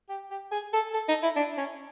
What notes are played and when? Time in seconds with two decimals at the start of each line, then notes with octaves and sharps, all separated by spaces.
0.09 G4
0.31 G4
0.51 G#4
0.73 A4
0.94 A4
1.08 D#4
1.23 E4
1.36 D4
1.57 C#4